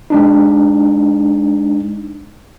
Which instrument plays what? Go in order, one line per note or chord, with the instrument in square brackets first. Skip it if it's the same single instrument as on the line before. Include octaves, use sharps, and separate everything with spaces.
[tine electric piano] G#3 D4 D#4